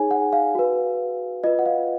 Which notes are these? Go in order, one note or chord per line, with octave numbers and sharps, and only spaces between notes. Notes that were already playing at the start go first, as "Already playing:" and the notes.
Already playing: D#4 G#4 C#5 G#5
F#5
F5
F#4 B4
F4 B4 D#5
F#5
F5